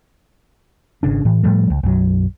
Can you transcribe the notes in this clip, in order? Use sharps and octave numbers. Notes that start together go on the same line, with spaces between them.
G#1 C#3 D4
A2 E3
A2 F3 G3 A3
C#2
B1 F#2 F#3